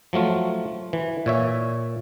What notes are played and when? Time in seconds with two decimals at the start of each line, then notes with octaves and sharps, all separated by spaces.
0.13 F3 F#3 A3 F4
0.93 E3
1.26 A#2 C#5 E5